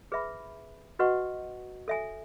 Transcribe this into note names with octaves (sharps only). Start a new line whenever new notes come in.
G#4 B4 E5 B5
F#4 B4 D#5 F#5 C#6
A4 E5 G#5